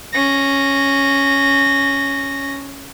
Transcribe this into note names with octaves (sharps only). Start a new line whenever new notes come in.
C#4 A#6